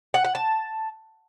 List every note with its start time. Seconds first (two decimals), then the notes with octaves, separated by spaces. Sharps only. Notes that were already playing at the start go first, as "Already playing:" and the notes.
0.14 F#5
0.24 F#5
0.35 A5